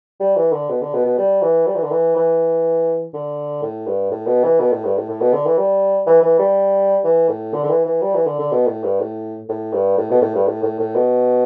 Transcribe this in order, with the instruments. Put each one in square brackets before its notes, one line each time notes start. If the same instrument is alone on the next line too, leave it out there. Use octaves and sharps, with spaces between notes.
[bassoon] G3
E3
D3
B2
D3
B2
B2
G3
E3
G3
E3
D3
E3
E3
D3
A2
G2
A2
B2
E3
B2
A2
G2
A2
A2
B2
D3
E3
G3
E3
E3
G3
E3
A2
D3
D3
E3
E3
G3
E3
D3
D3
B2
A2
G2
A2
A2
G2
A2
B2
A2
G2
A2
A2
A2
B2